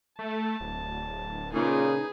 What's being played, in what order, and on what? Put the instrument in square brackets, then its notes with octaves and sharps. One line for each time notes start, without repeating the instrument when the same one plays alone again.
[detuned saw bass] A3 [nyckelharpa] A5
[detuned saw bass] D1
[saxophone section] A#2 C#3 [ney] D#4 [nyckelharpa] G#4 B4